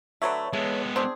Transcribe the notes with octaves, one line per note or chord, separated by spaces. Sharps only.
D3 F#3 A3 B4 C#5 E5
G#3 B3 A4
C4 D4 G#4